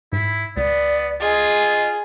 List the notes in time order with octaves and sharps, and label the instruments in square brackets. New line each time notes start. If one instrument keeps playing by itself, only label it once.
[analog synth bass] G#2 [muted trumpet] E4
[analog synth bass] C#2 [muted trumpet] B3 [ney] D5
[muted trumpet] F4 [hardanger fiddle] G#4 [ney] D#5